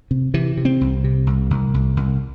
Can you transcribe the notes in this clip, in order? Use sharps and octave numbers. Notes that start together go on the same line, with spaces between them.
C3
C3 E3
C3
C4
C2
C3
C2
C2
C2
C2